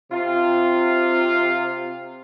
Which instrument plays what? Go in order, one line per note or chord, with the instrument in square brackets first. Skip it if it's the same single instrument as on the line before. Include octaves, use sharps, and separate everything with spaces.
[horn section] C3 F4